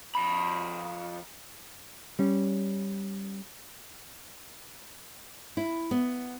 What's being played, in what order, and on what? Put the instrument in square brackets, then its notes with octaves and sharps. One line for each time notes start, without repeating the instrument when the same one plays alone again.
[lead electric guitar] F2 B5
[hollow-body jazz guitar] G3 C#4
[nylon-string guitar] E4
B3